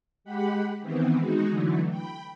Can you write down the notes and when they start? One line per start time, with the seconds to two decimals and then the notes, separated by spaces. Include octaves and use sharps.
0.24 G#3 G4 F#5 B5
0.81 D#3 E3 B3 C4
1.18 G#3 D#4 F#4
1.50 D3 E3 F#3 A3
1.88 G5 B5